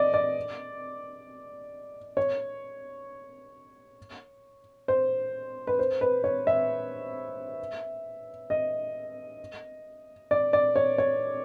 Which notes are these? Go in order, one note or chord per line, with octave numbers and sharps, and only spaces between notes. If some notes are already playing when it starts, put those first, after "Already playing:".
Already playing: D5 D#5
D5
C#5
C5
B4
C5
B4
C#5
E5
D#5
D5
D5
C#5
C#5